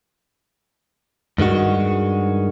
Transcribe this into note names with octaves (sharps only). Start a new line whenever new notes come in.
G2 D#3 G#3 F#4